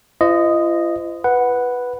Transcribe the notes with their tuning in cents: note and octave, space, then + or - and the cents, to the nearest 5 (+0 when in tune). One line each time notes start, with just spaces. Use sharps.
F4 -45 C5 -30 D#5 -5
B4 +0 F#5 +0